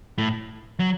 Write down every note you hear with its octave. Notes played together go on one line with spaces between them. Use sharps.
A2
F#3